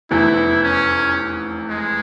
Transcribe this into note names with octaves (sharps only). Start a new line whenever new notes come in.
F1 E2 E3 E4
C#4
G#3